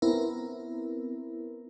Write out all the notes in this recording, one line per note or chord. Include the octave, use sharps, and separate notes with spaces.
B3 C4 E4 A#4